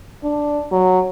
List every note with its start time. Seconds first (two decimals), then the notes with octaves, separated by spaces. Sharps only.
0.24 D4
0.71 F#3